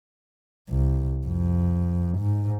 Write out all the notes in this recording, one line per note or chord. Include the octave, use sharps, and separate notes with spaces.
C2
F2
G#2